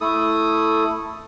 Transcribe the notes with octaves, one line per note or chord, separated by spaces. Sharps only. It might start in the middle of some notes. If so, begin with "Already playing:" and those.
A3 E4 A4 D#6